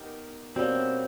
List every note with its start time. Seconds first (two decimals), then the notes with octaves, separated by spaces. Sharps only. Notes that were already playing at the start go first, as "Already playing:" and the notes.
Already playing: B3 D#4 G4 A#4
0.56 B2 G3 A#3 C4 C#4